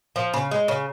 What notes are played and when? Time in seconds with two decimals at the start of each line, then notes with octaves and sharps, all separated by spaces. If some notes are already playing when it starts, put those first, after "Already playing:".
0.16 F3
0.34 C#3
0.51 G#3
0.68 C#3